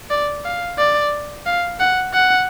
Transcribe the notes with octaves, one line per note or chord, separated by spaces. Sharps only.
D5
F5
D5
F5
F#5
F#5